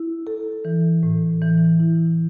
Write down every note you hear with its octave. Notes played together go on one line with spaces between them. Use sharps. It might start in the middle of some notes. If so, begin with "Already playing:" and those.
Already playing: E4
A4
E3
A2
E3
E4